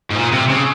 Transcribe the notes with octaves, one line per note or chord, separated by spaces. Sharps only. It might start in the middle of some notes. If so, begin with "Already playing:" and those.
G#2
A#2
C3
C#3